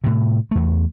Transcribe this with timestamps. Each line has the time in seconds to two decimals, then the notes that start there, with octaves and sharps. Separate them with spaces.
0.04 A2 C3
0.51 E2 A3